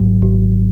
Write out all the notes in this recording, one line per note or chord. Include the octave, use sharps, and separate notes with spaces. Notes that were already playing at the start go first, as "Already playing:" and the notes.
Already playing: G#1 G#2 F#3
G#1